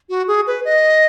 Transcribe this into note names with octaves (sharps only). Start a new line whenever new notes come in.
F#4
G#4
B4
D#5